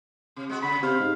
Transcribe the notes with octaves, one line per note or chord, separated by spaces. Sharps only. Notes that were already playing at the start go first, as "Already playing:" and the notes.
C3
G#3 F#4
C#3 B5
C3 C5 F5
G#2